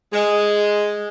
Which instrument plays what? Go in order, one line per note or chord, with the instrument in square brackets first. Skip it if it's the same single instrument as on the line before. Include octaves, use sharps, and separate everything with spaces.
[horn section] G#3